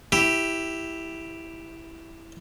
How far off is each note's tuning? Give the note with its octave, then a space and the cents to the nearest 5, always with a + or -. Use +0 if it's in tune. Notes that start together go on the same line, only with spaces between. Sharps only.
E4 +0 G4 +0